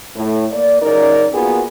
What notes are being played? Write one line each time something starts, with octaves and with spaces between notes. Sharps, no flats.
A2
A#3 D5
F#2 C#3 C#4 D#4 A#4 D5
A#3 B3 F4 F#4 G#4 A#4